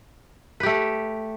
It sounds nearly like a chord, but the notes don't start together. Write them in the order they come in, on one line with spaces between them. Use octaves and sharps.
B4 G4 A3